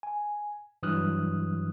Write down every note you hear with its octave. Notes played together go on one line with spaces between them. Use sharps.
G#5
G2 E3 F#3 D#6 F6 F#6